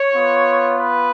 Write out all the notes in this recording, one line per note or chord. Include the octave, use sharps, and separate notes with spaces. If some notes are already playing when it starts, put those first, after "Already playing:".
Already playing: C#5
B3 F4
B4